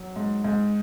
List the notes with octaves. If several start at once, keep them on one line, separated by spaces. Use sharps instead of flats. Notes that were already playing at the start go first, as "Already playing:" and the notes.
Already playing: F#3
G#2
G#2